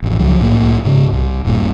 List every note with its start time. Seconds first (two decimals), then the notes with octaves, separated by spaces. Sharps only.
0.02 A1 F2
0.19 C#2 F3 F#3
0.39 C2 A2 F#3 A#3
0.84 G#2 C#3
1.12 C2
1.45 D#1 G2 A#2